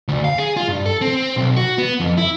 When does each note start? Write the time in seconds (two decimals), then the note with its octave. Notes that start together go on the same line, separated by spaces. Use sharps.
0.08 D2
0.24 F5
0.38 G#4
0.57 F4
0.68 G2
0.85 A4
1.01 C4
1.37 B1
1.56 F#4
1.78 B3
2.00 F2
2.17 E4